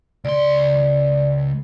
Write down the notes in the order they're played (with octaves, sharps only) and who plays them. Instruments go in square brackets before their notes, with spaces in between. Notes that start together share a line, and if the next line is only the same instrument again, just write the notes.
[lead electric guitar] C#2 C6 [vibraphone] D5